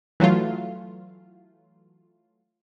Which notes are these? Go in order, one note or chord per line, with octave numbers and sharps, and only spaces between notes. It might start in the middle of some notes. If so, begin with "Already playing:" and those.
E3 F#3 A3 F4